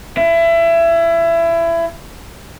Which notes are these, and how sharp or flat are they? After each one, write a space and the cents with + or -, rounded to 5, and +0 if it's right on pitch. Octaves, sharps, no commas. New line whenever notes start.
E4 +25